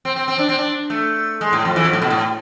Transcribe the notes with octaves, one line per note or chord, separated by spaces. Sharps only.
C4
C4
C4
D4
C4
D4
A3
G#3
A2
F2
E3
F2
A2
B2
A2